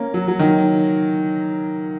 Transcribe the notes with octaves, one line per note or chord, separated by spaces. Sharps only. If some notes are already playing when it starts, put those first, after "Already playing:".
Already playing: A#3 C#4
F#3
F#3
D#3